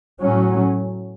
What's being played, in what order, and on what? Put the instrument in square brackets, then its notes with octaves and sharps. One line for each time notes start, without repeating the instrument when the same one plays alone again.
[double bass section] A2 F#3 C#4